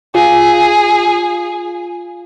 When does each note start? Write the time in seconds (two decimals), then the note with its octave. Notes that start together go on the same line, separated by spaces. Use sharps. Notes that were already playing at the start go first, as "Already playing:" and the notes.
0.15 F4 G#4